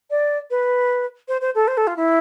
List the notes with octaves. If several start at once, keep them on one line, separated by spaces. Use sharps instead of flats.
D5
B4
C5
C5
A4
C5
A4
F4
E4